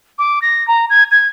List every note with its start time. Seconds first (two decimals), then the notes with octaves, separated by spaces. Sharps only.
0.19 D6
0.42 A#6
0.68 A#5
0.90 G#6
1.11 G#6